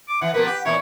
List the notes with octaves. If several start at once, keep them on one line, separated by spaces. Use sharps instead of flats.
D6
E3 E5 F#5
B2 F3 A#3 A#4 B4
G4 F#5
E2 A#2 E4 C#5 E5